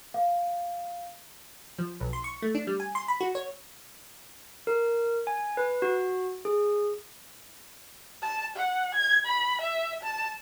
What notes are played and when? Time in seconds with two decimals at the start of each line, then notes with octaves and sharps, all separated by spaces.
0.14 F5
1.79 F3
2.00 B1
2.13 C6
2.24 C#6
2.42 A3
2.55 D4
2.67 G3
2.80 G#5
2.95 C6
3.08 B5
3.21 F#4
3.35 C#5
4.67 A#4
5.27 G#5
5.57 B4
5.82 F#4
6.45 G#4
8.23 A5
8.56 F#5
8.95 G#6
9.26 B5
9.61 E5
10.03 A5